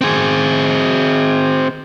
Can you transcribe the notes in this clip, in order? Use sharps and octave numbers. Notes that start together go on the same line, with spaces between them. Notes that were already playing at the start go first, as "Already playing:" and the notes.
C4 G#4